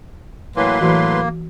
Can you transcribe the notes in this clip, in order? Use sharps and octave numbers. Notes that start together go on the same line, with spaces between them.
A2 E3 F#3 A#3 B4 C6
A2 E3 F#3 F#4